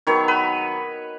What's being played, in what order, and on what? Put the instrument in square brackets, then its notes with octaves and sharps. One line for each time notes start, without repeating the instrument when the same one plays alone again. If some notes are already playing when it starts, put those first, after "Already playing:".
[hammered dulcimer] D#3 F#3 B3 C#5
B4